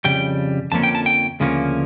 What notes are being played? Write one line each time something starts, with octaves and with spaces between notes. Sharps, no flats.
F2 C#3 G3 G5
F2 D3 F3 A#3 C#4 A5
G5
A5
G5
D2 C#3 F3 A#3 C#4